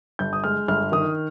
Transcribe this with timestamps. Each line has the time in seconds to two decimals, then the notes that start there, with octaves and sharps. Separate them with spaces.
0.19 G1 G6
0.33 D#6
0.44 G#3 F6
0.68 G1 F6
0.92 D#3 D#6